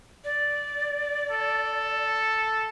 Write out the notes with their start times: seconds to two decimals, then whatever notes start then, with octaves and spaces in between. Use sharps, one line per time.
0.24 D5
1.31 A4